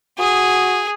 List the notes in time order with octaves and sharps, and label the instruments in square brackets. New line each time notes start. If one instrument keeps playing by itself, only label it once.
[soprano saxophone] F#4 [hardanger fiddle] G#4 [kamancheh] D#6